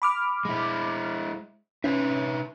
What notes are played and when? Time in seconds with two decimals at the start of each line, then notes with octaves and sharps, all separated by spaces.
0.02 B5 D6 F6
0.45 G#3 E4
1.84 C#4 D#4 B4 E5